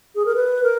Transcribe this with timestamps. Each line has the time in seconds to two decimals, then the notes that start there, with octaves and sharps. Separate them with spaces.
0.15 G#4
0.26 A#4
0.35 B4
0.63 A#4